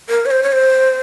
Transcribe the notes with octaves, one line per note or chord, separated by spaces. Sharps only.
A#4
C#5
C5
C#5
C5